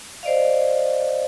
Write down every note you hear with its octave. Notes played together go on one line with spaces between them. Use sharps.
C5 D5 D#5 F5